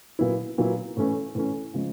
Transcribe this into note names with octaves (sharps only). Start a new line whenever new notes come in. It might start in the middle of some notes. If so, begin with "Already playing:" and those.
A#2 F#3 B3 E4
A#2 F#3 B3 E4
A2 E3 A3 C#4
A2 E3 A3 C#4
C#3 F3 G#3